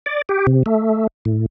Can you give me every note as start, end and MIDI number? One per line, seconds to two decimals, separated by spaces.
0.06 0.22 74
0.29 0.46 67
0.47 0.63 48
0.66 1.07 57
1.25 1.46 45